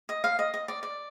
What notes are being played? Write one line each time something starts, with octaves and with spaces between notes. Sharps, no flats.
D#5
F5
D#5
D#5
D5
D5